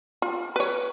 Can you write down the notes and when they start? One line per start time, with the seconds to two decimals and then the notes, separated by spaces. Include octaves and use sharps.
0.22 F4
0.56 B4 C#5